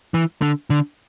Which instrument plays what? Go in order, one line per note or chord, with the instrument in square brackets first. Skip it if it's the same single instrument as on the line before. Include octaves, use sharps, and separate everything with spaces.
[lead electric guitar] E3
D3
D3